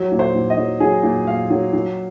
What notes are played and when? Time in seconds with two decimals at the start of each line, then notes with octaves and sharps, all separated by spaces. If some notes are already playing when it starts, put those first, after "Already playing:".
Already playing: F#3
0.12 A#2
0.19 C5
0.35 A#2
0.50 D#5
0.58 F#3
0.80 F#3 G#4
1.03 A#2
1.27 A#2 F5
1.50 F#3
1.73 F#3